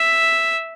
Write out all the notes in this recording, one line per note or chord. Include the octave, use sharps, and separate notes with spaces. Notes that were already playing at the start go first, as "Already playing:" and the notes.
Already playing: E5